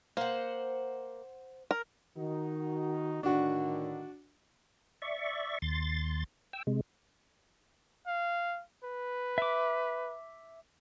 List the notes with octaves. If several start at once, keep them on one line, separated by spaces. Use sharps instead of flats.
A#3 C5 F#5
A#4
D#3 D#4 F#4
A2 D3 D#3 D4 F#4
D5 E5 C#6
D#2 C6 A6
G5 E6
C3 G#3
F5
B4
E5 D6